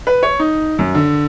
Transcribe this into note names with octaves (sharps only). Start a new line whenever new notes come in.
B4
C#5
D#4
F#2
D3